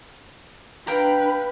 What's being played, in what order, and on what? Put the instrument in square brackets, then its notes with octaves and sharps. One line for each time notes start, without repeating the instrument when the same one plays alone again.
[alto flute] D4 [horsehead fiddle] B4 [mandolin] F5 G5 A#5